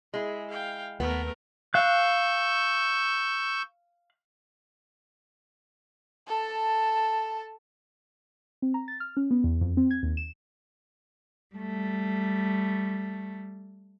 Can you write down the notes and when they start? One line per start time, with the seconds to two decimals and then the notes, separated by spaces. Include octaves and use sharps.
0.14 G#3 E4 G#4
0.50 F5 G5
1.00 D#2 A3 B3 A#4
1.74 F5 C#6 E6 F#6 G6
6.27 A4 A5
8.62 C4
8.74 A#5
8.88 A6
9.00 F6
9.17 C#4
9.31 B3
9.44 E2
9.61 F2
9.77 C4
9.91 G#6
10.03 D#2
10.17 E7
11.55 G3 A3